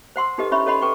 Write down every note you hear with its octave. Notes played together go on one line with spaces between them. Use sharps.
C5 F#5 C6 E6
D#4 G4 A4 B4 D#5 D#6
C#4 E4 C#5 E5 B5 C#6
A4 C#5 D#5 F#5 B5 C6
A4 B4 G5 C#6 D6